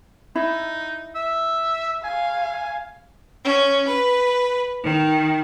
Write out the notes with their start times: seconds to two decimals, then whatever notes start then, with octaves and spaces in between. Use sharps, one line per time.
0.35 D#4 E4
1.15 E5
2.04 F5 G#5
3.43 C#4
3.86 B4
4.83 D#3